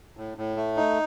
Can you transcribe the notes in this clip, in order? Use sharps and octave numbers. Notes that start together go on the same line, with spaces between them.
A2
A2
A3
D#4